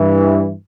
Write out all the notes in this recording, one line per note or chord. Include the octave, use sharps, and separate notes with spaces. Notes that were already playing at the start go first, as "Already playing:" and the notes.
Already playing: G2 E3